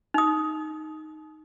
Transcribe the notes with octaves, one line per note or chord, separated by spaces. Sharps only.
D#4 D#6